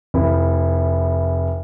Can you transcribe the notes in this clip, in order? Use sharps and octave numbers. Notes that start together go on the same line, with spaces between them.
F1 E4